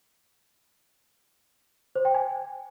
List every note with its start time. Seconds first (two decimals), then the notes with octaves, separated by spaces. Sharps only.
1.95 C5
2.05 G5
2.15 G#5